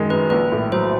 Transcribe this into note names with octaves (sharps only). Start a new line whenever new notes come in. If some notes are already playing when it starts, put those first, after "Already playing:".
Already playing: F#2 D#3 G#3
F#2 B4
A#1 B4
A2
F#3 C5